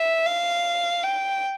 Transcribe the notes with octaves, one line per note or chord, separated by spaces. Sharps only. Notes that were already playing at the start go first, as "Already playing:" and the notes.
Already playing: E5
F5
G5